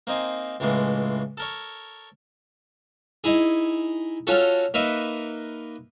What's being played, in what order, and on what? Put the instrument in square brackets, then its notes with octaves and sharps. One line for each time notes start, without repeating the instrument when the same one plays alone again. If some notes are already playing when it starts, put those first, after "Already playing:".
[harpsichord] A#3 C4 D#4 G#5
C#2 A2 E3 G#3 A#3
A4 A#4 C#5
D#4 E4 G#4
C#4 F4 F#4 A4
A#3 D#4 B4 E5 C#6